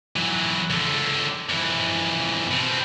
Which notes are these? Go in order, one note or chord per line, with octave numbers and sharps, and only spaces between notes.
E3 F#3
C#2 D3
F2 E3
B2 C4